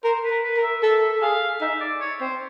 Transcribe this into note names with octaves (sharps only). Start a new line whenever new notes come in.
A#4 C5
B4
A#4
B4
A#4
E5
A4 E5
G#4 F5
D#4 E5
D5
C#5
C4 C5